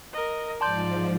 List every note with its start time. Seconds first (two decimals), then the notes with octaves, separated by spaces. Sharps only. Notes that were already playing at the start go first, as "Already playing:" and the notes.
0.13 A#4 D#5
0.61 G#2 F3 D5 A5 C6 G6